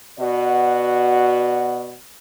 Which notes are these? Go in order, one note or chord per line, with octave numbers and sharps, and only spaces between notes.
B2 F#4 D5